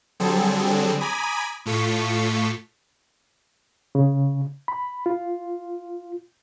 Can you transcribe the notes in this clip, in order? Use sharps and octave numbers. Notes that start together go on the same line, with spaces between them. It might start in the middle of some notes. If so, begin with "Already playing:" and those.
D3 F#3 G3 C4 G#4 A4
G#5 A#5 B5 D6 D#6
A2 F4 A4 C#6 B6
C#3
B5
F4